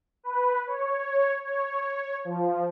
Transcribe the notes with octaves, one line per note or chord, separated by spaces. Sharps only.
B4
C#5
C#5
F3